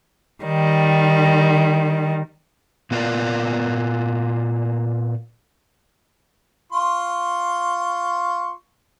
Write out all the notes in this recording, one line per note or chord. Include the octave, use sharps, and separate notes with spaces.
D#3 G3
A#2 B3 F4 G4 A#4 D5
F4 C6 C#6